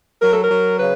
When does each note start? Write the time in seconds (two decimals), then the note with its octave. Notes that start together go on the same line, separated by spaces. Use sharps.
0.22 F#3 A#4
0.33 A4
0.44 A#4
0.51 F#3
0.79 C#3 B4